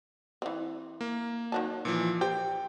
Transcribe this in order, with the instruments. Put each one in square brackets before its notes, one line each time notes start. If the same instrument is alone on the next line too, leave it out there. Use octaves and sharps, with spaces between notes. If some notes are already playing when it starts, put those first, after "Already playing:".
[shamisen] E3 C4
[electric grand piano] A#3
[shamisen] D#3 F#3 A5
[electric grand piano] A#2 E3 F3
[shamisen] G4 C5 [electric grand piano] G5